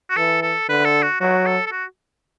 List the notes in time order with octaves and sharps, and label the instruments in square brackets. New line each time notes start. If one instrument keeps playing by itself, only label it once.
[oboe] F#4
[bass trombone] E3 [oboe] A4
[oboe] A4
[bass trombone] D3 [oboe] B4
[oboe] A4
F#4
[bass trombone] F#3 [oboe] F#4
[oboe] A4
A4
F#4